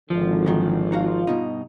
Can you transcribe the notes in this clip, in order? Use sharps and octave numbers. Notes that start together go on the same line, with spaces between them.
G#1 D3 F3
F#2 D#3 E3
D#4 F4 F#4 F5
G2 B2 D#4